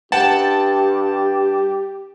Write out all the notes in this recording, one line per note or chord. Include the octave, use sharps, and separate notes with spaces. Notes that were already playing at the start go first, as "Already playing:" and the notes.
G2 G4 F#5 G5 A5